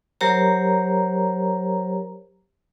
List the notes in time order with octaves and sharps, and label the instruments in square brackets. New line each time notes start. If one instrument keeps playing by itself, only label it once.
[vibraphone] F#3 G4 A#4 C5 C#5 A#5